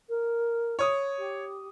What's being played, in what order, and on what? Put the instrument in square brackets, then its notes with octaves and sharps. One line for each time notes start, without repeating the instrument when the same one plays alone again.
[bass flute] A#4
[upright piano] C#5 D#6
[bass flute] G4